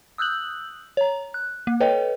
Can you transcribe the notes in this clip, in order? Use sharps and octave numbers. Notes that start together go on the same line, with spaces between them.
D#6 E6 F#6 G6 F#7
C#5 A#5
F#6
A#3
A4 B4 C#5 D#5 G5